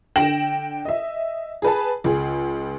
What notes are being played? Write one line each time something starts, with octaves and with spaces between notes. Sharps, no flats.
D3 G5 A#6 E7 F#7
D#5 E5
G#4 B4 A5
C#2 G#4